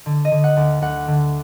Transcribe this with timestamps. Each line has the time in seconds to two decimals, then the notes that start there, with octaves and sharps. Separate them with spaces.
0.06 D3
0.25 D#5
0.31 D3
0.44 F#5
0.57 D2
0.82 D2 F#5
1.07 D3